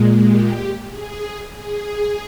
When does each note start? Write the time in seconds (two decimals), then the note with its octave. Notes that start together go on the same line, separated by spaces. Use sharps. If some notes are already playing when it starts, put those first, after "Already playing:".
Already playing: A#2 G#3
0.21 G4
0.87 G#4
1.54 G#4